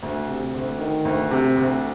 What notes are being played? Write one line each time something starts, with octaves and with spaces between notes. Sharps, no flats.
D2
C3
D2
D#3
D2
C3
D2